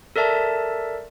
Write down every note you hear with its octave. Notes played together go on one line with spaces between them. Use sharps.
A4 A#4 D5 E5 A5